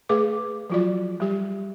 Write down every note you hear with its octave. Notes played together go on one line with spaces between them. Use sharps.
A3 G#4 B4 D6
F3 F#3 F4 F#4 D5
G3 G4